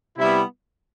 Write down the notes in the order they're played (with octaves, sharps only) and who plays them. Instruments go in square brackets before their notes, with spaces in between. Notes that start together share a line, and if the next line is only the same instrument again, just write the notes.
[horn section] C3 G3 B3 E4